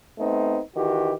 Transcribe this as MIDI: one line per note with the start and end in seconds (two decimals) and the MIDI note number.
0.18 0.58 57
0.18 0.58 59
0.18 0.58 60
0.18 0.58 63
0.76 1.12 51
0.76 1.12 52
0.76 1.12 66
0.76 1.12 67